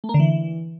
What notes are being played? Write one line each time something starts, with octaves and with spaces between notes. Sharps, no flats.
A3
A#3
D3
E3